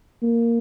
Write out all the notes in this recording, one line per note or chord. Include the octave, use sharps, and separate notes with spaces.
A#3